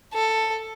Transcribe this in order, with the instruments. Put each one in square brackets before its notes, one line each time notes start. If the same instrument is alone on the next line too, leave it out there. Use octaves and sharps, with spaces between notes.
[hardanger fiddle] A4